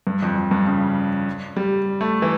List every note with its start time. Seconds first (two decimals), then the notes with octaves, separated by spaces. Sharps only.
0.07 G2
0.23 F2
0.37 F2
0.51 G2
0.67 C#3
1.57 G3
2.01 A3
2.22 E3